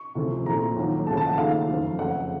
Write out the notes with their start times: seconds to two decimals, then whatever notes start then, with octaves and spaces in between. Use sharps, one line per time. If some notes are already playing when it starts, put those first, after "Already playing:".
Already playing: C#6
0.15 C#2 C3 F3 A3
0.46 A#1 A#2 F3 A3 A#5
0.76 D#2 D#3 F#3
1.07 C#2 C#3 F3 A3 A5
1.17 A5
1.27 F#5
1.38 D#2 D#3 A3 F5
1.68 F#1 F2 D#3 A3
1.99 F2 C#3 A3 F#5